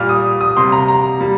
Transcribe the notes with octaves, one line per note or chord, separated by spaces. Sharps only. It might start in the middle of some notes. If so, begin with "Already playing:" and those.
Already playing: A#2 G3 A#3 F6
D#6
D#6
C3 G3 A#3 C6
A#5
A#5
G3 A#3